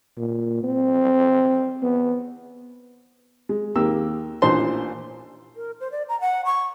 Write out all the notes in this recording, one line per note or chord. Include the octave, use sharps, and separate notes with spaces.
A#2
C4
B3
G#3
D#2 A#3 G4 E6
A1 A#2 D4 C5 A5 C6
A#4
C5
D5
A#5
F#5
C#6